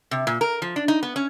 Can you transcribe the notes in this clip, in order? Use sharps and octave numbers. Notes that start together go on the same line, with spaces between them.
C3
A#2
A#4
F3
D4
D#4
B3
C#4